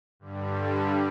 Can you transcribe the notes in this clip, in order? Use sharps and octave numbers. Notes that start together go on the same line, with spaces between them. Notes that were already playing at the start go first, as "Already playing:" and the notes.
G2 D3 G3